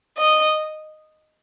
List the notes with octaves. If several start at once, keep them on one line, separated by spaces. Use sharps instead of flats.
D#5